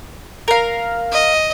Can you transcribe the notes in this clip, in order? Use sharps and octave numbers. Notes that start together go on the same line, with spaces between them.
A#4 F5
D#5